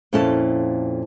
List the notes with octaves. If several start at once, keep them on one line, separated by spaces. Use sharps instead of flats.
F2 A#2 C#4 E4 A4 A5